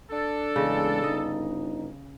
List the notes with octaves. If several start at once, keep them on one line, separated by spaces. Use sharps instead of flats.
D4 A4
A1 E2 C#3 G#3
G1 D#4 D#5